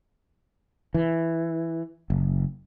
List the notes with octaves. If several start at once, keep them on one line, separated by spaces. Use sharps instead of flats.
E3
F#1